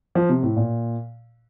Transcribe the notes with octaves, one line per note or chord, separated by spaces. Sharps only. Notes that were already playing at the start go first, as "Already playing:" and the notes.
F3
C3
A2
A#2